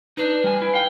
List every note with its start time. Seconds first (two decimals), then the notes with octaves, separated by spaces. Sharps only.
0.17 D4 D#4 B4
0.44 G3 G#5
0.62 E4
0.74 F5 G5